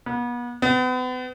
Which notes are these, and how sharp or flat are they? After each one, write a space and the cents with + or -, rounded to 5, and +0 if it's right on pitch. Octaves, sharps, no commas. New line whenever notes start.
B3 -35
B3 +40